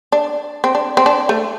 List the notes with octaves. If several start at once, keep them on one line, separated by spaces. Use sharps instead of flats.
D4
C4
D4
C4
D4
A3